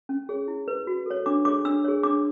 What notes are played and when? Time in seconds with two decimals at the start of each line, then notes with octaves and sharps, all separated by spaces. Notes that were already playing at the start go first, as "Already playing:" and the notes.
0.09 C#4
0.29 G#4 C#5
0.48 E4
0.68 B4
0.87 F#4
1.06 A4 C#5
1.26 D4 D6
1.45 G#4 C#5 D6
1.65 D4 E6
1.84 G#4 C#5
2.03 D4 D6